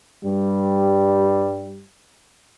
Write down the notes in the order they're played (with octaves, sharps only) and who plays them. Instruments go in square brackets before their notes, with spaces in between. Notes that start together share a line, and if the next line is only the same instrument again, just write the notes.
[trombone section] G2 G3